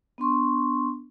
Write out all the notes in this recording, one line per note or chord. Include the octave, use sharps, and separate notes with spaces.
B3 D4 C6 C#6